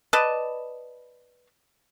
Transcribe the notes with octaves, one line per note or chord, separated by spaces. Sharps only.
B4 D5 D#5 A5